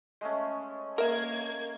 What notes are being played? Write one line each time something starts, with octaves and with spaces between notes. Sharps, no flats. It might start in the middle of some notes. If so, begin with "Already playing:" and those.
G#3 A3 C#4
A#3 A#4 E5 G#6